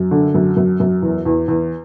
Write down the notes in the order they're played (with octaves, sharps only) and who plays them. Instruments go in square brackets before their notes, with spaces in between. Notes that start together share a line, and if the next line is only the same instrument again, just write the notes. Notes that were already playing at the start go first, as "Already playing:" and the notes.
Already playing: [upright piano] F#2
D3
F#2
F#2
F#2
E2
E2
E2